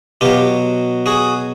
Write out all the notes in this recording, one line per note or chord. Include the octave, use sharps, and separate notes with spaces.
B2 F#3 F4 G4
F#4 G#4